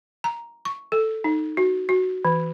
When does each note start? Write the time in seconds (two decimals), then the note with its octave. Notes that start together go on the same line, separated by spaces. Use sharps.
0.24 A#5
0.65 C#6
0.92 A4
1.24 D#4
1.57 F#4
1.89 F#4
2.25 E3